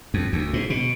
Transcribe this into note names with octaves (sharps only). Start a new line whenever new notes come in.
F2
D2
G#2
B2